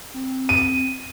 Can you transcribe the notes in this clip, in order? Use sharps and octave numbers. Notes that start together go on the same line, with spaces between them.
C4
D#7